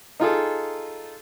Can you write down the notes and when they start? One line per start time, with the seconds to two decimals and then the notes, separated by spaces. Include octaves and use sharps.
0.20 D#4 F4 G#4 A4